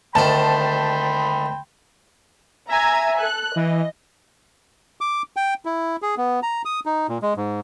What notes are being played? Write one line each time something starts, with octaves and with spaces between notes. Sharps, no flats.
D2 D#3 C5 G5 A5 B5 C6
E5 G#5 A#5 G#6
A4 F#6
E3 D#5
D6
G5
E4
G#4
B3
A#5
D#6
D#4
A#2
G#3
G#2